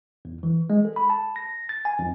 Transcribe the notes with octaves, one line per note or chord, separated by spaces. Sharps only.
E2
E3
G#3
A4
B5
A5
A#6
A6
G#5
F2